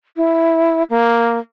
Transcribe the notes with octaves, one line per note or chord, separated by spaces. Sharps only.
E4
A#3